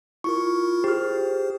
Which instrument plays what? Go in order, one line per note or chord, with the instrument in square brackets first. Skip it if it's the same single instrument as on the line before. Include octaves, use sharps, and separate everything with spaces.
[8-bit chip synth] E4 F4 A#4 [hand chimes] C#6
[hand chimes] G4 F6 [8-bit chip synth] G#4 C5